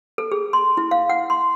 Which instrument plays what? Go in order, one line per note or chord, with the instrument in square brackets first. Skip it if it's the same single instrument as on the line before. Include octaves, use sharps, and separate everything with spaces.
[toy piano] A4
G#4
C6
E4
F5
F#5
C6